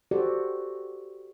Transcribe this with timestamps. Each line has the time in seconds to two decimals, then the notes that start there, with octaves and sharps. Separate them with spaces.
0.11 F#4 G4 A4 C5 D5